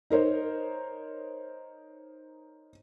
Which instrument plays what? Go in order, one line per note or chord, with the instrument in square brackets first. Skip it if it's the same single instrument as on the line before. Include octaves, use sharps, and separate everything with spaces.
[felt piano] D#4 A#4 C5 C#5